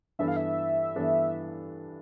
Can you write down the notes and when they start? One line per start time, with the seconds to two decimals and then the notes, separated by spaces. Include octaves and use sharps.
0.19 G2 E3 B3 D4 A4 E5
0.28 F5
0.36 E5
0.96 G2 E3 B3 D4 A4